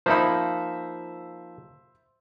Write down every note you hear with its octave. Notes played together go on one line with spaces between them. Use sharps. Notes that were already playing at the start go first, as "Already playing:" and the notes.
F3 A#3 D#4 C5 E5 B5